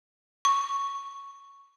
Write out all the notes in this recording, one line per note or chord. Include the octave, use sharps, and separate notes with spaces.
C#6